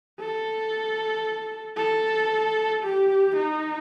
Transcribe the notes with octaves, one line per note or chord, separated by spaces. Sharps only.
A4
A4
G4
D#4